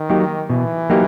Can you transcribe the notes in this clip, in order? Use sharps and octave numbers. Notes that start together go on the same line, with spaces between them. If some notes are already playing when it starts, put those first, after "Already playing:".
Already playing: D#3
F#3 A#3 D#4 G4
B2 E3
F#3 A#3 D#4 G4